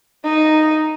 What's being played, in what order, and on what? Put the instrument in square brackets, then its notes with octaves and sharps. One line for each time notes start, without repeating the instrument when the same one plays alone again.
[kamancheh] D#4